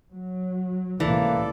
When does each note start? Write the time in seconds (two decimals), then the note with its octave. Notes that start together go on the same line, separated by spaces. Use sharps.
0.12 F#3
1.00 C#2 A2 C3 E3 A#3 A4 D5